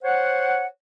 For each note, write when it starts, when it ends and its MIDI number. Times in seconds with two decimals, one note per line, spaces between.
0.03 0.66 72
0.03 0.66 73
0.03 0.66 78